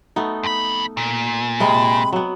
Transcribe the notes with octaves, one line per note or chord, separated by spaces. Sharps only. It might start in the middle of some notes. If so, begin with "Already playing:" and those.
A3 B3 D#4
F2 B5
A#2
C3 G#3 D#5 B5
F#3 B3